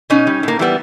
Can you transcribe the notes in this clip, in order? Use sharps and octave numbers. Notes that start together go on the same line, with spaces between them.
B2 C#4 D#4
G3
A2 A#3
E3 G3 B3